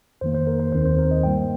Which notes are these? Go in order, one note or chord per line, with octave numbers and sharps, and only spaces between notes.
F2 D#3 A#3 C5
C5
A#4
C5
D#2 D#3 C4 C5
C5
A#4
D#5
G2 G3 A#3 G5